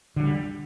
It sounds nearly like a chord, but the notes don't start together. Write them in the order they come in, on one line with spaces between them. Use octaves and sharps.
D3 F3 G3